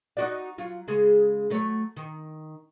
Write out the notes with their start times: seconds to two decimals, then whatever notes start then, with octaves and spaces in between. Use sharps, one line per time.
0.17 D#4 F#4 D5
0.58 F#3 F4
0.88 C#3 G#3 G#4
1.50 F#3 A3 C#5
1.96 D#3